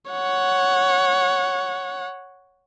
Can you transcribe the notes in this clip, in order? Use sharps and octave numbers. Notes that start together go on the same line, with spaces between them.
C#5 F#5